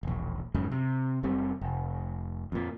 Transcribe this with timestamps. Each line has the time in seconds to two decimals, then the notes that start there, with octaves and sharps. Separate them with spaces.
0.03 E1 A#1
0.54 F2 G#2 C#3 F#3
0.72 C3
1.23 F#1 G3 C4
1.61 F1
2.52 F2 A#2